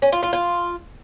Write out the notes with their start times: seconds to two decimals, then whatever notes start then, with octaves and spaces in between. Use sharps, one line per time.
0.02 C#4
0.12 F4
0.23 F4
0.33 F4